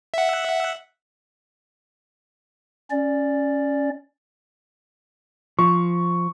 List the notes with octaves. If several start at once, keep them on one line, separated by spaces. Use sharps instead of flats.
E5 F#5
C#4 D5
F3 C#6